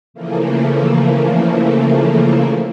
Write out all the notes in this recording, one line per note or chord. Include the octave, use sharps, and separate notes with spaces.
C#3 E3 F3 A3 A#3